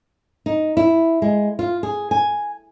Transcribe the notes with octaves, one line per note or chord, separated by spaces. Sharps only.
D#4
E4
G#3
F4
G#4
G#5